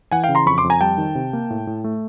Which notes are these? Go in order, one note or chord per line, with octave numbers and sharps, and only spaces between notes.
E3 F#5 G#5
F5 G5
C#3
A#5 C6
F2 B5 C#6
C6 D6
F2
G#5 A#5
G3 G5 A5
D#3
C3
A#3
A2
A2
A3